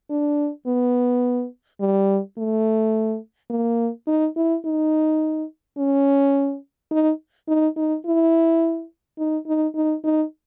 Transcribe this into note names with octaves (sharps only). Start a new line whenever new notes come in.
D4
B3
G3
A3
A#3
D#4
E4
D#4
C#4
D#4
D#4
D#4
E4
D#4
D#4
D#4
D#4